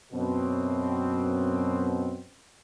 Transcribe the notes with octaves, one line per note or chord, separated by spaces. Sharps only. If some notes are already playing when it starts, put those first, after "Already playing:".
F#2 B2 C4